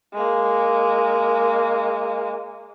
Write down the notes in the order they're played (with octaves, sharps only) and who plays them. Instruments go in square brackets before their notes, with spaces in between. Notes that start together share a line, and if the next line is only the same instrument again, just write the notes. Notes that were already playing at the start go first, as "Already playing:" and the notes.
[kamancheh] G#3 A#3